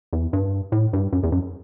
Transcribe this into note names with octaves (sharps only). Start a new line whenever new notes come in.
E2
G2
A2
G2
F#2
E2
F#2